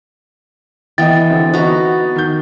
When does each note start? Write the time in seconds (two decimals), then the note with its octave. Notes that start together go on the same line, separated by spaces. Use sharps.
0.98 E3 B3 D#5 G5 A6
1.30 D3 C4
1.54 B3 D#4 F#4 A#5
2.16 D#3 G6